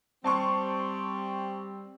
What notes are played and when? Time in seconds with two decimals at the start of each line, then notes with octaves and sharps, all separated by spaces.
0.24 G3 C4 A5 C6 C#6